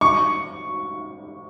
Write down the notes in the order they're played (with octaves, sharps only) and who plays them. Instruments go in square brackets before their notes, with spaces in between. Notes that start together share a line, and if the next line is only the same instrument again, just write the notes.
[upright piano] C#6